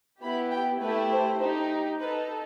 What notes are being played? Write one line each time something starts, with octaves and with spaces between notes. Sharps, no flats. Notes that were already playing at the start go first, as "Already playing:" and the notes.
B3 E4 G4 B5
G5
A3 E4 G4 B4
C5
D#4 G4
D#4 A4 B4